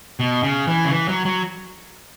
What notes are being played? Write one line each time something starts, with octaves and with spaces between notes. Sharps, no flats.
B2
C#3
E3
C#3
E3
F#3
F#3